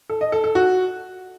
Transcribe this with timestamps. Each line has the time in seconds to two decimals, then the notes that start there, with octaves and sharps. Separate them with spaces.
0.09 A4
0.21 D#5
0.32 A4
0.44 A4
0.55 F#4